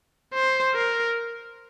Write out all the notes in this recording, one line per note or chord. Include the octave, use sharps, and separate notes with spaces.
C5
A#4